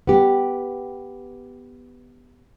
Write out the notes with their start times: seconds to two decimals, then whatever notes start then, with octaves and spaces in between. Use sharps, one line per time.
0.07 B3 G4